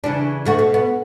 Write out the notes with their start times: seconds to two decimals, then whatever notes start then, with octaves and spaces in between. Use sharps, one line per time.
0.04 C#3 E3 D4
0.45 D2 A3 F#4
0.59 B2
0.74 B3